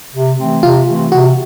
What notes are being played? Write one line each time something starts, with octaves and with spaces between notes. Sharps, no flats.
C3
E3 A3 C4
C3 F4
E3 A3 C4
C3 F#4